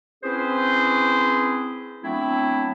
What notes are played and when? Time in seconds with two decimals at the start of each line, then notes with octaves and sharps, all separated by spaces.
0.24 C4 C#4 E4 G#4 B4 C5
2.04 F#3 A3 B3 C4 D4 E4